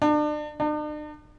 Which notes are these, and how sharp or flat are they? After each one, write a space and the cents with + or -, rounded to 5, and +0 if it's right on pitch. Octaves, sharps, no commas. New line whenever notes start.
D4 +35
D4 +45